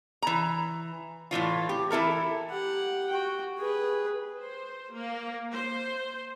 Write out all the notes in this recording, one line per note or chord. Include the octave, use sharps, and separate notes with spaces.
E3 A#5
A2 C3 E3 F4
G4
E3 E4 A4 A#4
G4 F#5
F#4 G5
G#4 B4
C5
A#3
C5